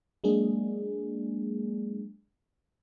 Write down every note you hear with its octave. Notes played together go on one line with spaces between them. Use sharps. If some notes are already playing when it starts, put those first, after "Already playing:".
F#3 G#3 A#3 D4 G#4